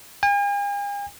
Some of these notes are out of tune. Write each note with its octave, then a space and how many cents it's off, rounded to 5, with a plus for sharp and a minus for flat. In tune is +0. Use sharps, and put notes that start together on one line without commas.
G#5 -45